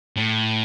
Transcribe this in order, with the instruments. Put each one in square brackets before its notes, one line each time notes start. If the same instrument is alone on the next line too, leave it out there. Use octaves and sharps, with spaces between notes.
[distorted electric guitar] A2